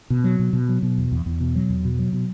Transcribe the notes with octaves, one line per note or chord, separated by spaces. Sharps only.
B2
F#3
B2
B2
F#3
B2
E2
E2
E2
B2
F#3
E2
B2
F#3
B2